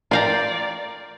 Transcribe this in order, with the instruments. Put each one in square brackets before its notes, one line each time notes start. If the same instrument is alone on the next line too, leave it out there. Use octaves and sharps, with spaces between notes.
[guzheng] F4 F5 A#5 [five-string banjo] A#4 G5 [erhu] D5